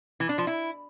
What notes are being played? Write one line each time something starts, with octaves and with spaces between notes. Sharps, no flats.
E3
D4
F3
E4